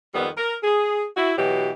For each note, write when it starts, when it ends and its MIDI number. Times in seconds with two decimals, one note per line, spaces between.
0.14 0.29 41
0.14 0.29 51
0.14 0.29 55
0.14 0.29 59
0.37 0.55 70
0.63 1.05 68
1.17 1.33 64
1.17 1.33 66
1.38 1.71 47
1.38 1.71 52
1.38 1.71 54
1.38 1.71 67